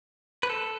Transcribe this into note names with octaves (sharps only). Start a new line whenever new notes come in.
B4
A4